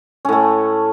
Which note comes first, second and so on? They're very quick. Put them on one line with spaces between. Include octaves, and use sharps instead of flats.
C#4 A2 A3